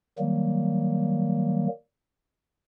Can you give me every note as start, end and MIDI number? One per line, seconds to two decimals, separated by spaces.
0.19 1.67 51
0.19 1.67 54
0.19 1.67 55
0.19 1.67 58